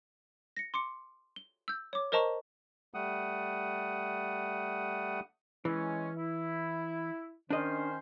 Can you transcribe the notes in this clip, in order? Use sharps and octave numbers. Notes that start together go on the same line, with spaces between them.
A#6 C#7
C6 D6 C#7
G7
E6 G6
C#5 D6
A#4 C5 D#5 A5 A#5 C#6
G3 A3 F#5 D#6
E3 G#3 C#4
E4
D#3 C#4 D4 C5 D#5